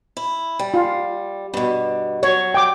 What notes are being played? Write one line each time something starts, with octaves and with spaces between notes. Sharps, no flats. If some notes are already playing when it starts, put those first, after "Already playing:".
E4
G3
F4
G2 B2
F#3 C#5
G5 D6